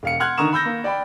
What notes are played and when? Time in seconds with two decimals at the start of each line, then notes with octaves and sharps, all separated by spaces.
0.03 E1 F5 C#7
0.20 F#5 C6 F6 F#6 G#6
0.38 D3 D#3 A#5 C#6 D#6 E7
0.53 B5 E6 G6 A#6
0.65 A#3
0.84 D5 G5 B5